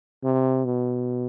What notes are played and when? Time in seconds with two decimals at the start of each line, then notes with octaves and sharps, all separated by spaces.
0.24 C3
0.65 B2